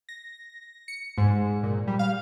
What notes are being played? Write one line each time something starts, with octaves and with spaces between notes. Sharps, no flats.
A#6
C#7
G#2
A#2
G3
F5